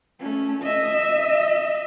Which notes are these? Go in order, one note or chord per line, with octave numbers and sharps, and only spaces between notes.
A3 C#4
D#5 E5